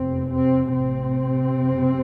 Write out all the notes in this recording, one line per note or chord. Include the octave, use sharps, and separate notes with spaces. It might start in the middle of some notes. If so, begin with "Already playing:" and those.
Already playing: F1 E2 C3 C4
C3 C4
A1 A2 C3 C4
F#1 F2 C#3